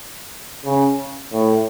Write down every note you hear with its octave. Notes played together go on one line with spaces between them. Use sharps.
C#3
A2